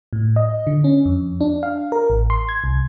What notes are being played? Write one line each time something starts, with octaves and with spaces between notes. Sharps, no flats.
A2
D#5
D3
C#4
F2
D4
F5
A#4
A1
C6
G#6
C2